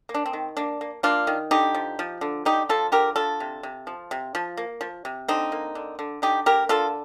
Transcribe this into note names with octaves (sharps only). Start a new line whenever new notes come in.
A#3
D4
C4
D#3
A#3 D4
A#3
A#3 D4 F4
D#3
D3 D#4 G4
F3
F3
D3
D3 D#4 G4
F3 F4 A4
D3 G4 A#4
D3 F4 A4
C3
C3
F3
C3
F3
A#3
F3
C3
D3 C4 D#4
A#3
D3
D3
D3 D#4 G4
A#3 G4 A#4
D3 F4 A4